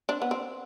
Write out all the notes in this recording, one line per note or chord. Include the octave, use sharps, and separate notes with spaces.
C4 D4
B3
C4